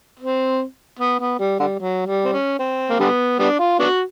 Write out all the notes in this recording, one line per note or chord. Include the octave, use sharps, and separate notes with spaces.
C4
B3
B3
G3
D3 G3
F#3
G3
C4
C#4
C4
A#3
D3 G3 B3
G3 B3 D4
F4
B3 D4 F#4